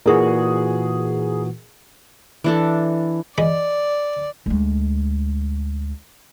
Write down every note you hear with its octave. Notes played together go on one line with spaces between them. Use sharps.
A#2 E3 F#4 G#4 A#4
E3 D4 A4
E3 G#3 D5 B5
D2 G#3